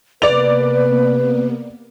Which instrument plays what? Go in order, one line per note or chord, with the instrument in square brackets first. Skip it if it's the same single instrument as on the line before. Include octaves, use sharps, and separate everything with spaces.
[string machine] C3 A#3 B3 [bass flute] B4 [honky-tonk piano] D5 F7